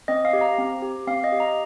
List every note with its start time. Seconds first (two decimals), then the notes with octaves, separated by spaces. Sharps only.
0.08 C4 D#5
0.25 F5
0.33 G4
0.41 A#5
0.58 C4
0.82 G4
1.07 C4 F5
1.24 D#5
1.32 G4
1.40 A#5